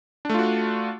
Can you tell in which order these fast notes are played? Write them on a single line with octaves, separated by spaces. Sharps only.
D4 A3 F4 F#4